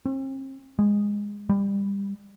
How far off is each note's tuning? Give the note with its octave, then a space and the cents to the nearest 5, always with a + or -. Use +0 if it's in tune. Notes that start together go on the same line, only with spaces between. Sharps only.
C4 +40
G#3 -15
G3 +25